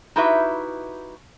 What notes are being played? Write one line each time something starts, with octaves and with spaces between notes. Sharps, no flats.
D#4 E4 F#4 G4 B4 E5